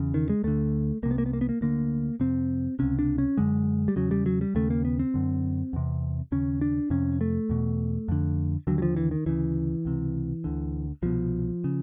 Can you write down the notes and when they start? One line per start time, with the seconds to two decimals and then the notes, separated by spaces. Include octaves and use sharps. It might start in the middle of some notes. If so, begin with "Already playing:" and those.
Already playing: E2 C#3
0.14 D#3
0.29 G#3
0.43 D2 D3 A3
1.03 C2 C3 A#3
1.11 B3
1.18 A#3
1.26 B3
1.33 A#3
1.41 B3
1.49 A#3
1.61 D2 D3 A#3
2.20 F2 C3 C4
2.79 C#2 C3 C#4
2.99 D4
3.18 C#4
3.37 F#2 D3 G#3
3.88 G3
3.96 E2 C#3 F#3
4.11 G3
4.26 F#3
4.41 G3
4.55 D#2 C#3 A3
4.70 A#3
4.85 B3
4.99 C4
5.14 F#2 D3
5.73 E2 C3
6.32 D#2 C#3 C#4
6.61 D4
6.90 F2 C3 C#4
7.21 A3
7.49 E2 B2
8.08 F2 D3
8.67 D#2 D3 F#3
8.78 F#3
8.82 F3
8.96 E3
9.11 D#3
9.26 D2 C#3 E3
9.85 C#2 C3
10.44 D2 D3
11.02 C2 B2 F3
11.64 C#3